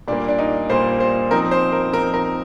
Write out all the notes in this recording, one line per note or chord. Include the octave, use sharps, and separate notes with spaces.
A#2 G3 A#3 D4
D4
D#4
A#2 G3 A#3 C5
C5
F3 C4 D#4 A#4
C5
A#4
F3 C4 D#4 A#4
A#4